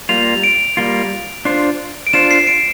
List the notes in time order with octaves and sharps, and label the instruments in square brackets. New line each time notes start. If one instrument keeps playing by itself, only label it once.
[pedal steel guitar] G3 A#3 F4 [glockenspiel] F7
[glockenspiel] D7
[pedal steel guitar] G3 A#3 F4
D4 F4 C5
[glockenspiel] D7
[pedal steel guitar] D4 F4 C5 [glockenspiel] E7
[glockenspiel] C7
D7